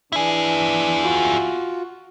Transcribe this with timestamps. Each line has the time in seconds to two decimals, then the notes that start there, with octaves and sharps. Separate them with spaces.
0.12 E3 D4 E4 G#4
1.03 F4 F#4